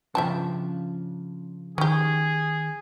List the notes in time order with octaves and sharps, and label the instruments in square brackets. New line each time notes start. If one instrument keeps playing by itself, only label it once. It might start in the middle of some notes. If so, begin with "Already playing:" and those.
[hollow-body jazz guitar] C#3 F3 D4 [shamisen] E5 G5 A5
[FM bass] D#3 [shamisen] C#4 G4 [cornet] G#4